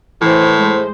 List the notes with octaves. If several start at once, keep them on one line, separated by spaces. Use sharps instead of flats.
A2 E3 C5
G#3 C5